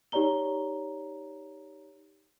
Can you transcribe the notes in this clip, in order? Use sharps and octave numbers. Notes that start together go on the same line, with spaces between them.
D#4 G4 C#5 D5 A#5 G7